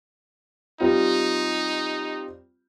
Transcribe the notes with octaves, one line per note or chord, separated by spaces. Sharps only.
G3 C4 D#4 F4